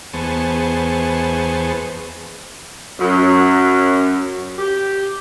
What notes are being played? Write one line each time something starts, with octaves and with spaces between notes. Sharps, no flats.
E2 B3 G#4 C5 A5 C#6
F#2
G4